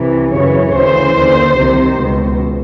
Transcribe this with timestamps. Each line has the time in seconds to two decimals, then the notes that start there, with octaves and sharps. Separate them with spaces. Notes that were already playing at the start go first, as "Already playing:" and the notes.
Already playing: C2 C3 E3
0.33 F#2 C#3 E3 C#5
0.74 D2 C#3 E3 C5
1.17 D#2 D3
1.58 C2 C3 D#3
2.00 C#2 B2